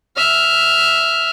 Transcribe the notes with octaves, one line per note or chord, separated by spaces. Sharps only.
E5 F6